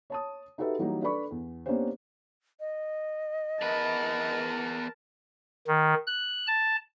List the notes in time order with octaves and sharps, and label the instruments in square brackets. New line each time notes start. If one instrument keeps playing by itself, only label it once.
[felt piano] C#5 A5 D#6
D#4 F#4 G4 A4 B4 E5
E3 F#3 G3 A#3 D#4
D4 A4 B4 D5 B5 C#6
E2
A#3 B3 C#4 D4 G4 C5
[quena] D#5
[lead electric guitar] E2 B4 [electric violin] A#4 A5
[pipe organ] D#3
F#6
A5